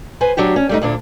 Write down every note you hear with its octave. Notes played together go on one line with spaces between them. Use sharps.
B4 C5 G#5
F#3 D4 F#4 G4
C#4
G3 A3 D#4
D2 A#2 D4